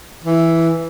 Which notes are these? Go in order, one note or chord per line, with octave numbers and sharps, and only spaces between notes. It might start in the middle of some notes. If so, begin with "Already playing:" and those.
E3